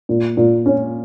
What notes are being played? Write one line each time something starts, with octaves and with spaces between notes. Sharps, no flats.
A#2
A#2
C#4